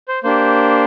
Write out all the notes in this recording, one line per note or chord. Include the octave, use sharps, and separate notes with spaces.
C5
A#3 D4 G4 C5